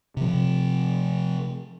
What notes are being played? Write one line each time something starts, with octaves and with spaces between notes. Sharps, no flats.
C3 F3